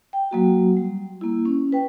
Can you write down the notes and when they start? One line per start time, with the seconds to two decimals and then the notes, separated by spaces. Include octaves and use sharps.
0.13 G5
0.31 F#3 A#3 F#4
0.77 G3
1.21 A#3 E4
1.45 C#4
1.72 B4 G5